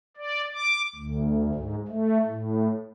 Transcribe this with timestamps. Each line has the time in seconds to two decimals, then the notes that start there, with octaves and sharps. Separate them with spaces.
0.17 D5
0.54 D6
0.96 D2
1.55 G#2
1.88 A3
2.26 A2